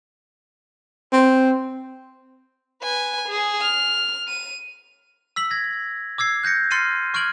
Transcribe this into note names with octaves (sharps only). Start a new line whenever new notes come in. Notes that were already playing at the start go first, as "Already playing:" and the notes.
C4
B4 G#5
G#4
F6
D#7
E6 B6 F#7
G#6 A#6
D6 E6 G#6 C7
F#6 G6 A#6 C#7
C6 F6 A6 C7 C#7 D#7
C#6 F6 G#6 D7 F#7